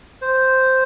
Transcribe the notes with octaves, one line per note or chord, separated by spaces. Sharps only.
C5